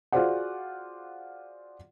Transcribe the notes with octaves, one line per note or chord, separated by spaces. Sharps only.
F4 F#4 G#4 C5 D5 F#5